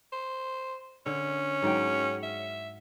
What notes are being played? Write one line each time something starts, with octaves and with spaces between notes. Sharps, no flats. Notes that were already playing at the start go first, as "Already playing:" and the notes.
C5
D3 C#4
G#2 F#3 G5
E5